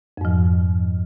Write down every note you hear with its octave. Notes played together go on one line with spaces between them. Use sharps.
F2 G#2 F3